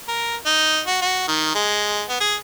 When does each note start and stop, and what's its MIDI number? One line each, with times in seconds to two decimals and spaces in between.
0.08 0.36 70
0.46 0.80 63
0.87 0.98 66
1.02 1.25 66
1.28 1.53 51
1.55 2.02 56
2.09 2.20 59
2.21 2.35 68